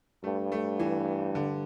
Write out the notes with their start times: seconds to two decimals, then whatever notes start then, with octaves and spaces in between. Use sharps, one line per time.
0.24 G2 A3
0.52 A3
0.79 E3
1.35 D3